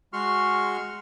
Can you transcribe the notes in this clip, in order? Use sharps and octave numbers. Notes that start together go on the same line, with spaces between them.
G#3 F#4 C6 C#6 F6